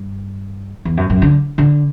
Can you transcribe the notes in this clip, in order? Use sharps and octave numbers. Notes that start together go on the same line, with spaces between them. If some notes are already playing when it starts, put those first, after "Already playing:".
Already playing: G2
E2
F#2
F#2
D3
D3